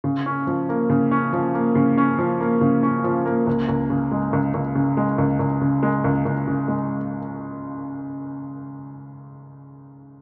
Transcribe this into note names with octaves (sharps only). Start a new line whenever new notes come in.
C#3
C#4
F3
A#3
C#3
C#4
F3
A#3
C#3
C#4
F3
A#3
C#3
C#4
F3
A#3
C#2
C#2
C#3
G#3
C#2
C#2
C#3
G#3
C#2
C#2
C#3
G#3
C#2
C#2
C#3
G#3